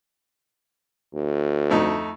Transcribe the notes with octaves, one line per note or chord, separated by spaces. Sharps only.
D2
F2 A3 D#4